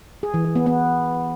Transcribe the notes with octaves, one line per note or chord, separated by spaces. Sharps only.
G#4
E3
E3
B3
B3